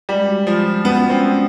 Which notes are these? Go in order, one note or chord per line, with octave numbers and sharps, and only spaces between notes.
G3 G#3
F#4
F3 G#3
F#4
B3 C#4
C#4
C4
G#3